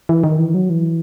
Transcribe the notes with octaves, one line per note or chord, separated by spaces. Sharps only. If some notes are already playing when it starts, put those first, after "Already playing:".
E3
D#3
E3
F#3
E3